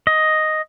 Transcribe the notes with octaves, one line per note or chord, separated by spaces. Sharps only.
D#5